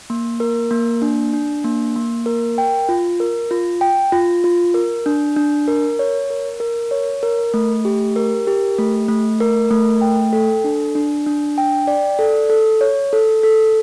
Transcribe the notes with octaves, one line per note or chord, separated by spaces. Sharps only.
A#3
A#4
A#3
D4
D4
A#3
A#3
A#4
G5
F4
A#4
F4
G5
F4
F4
A#4
D4
D4
A#4
C#5
A#4
A#4
C#5
A#4
A3
G4
A#4
G4
A3
A3
A#4
A3
G5
A4
D4
D4
D4
G5
D5
A4
A4
C#5
A4
A4